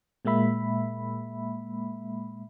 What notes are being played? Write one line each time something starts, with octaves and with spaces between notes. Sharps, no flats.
A#2 G#3 A#3 E5 B5